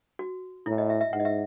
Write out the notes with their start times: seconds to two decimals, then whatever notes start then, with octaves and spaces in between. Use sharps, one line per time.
0.19 F#4
0.66 A2 E4
0.78 D#5
0.90 E5
1.01 E5
1.13 G#2 F#5
1.20 D#5
1.25 E5